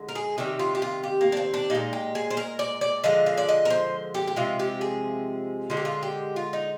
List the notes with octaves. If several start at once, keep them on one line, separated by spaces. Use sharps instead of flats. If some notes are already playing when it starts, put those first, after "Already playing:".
Already playing: D3 G#3
A#4
G#4
C3 D#3 G3 G4
F4
G4
F4
G4
A#3
D4
C4
D4
A#2 G#3 D#4
G4
G#4
C5
A#4
D5
D5
D3 F3 G#3 D#5
F5
D5
D#5
A#4
C5
G4
G4
C3 F3 G#3 F4
G4
G#4
D3 G#3 F4
G4
F4
G4
F4
D#4